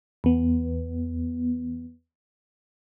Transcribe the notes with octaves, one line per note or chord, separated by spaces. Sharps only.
E2 B3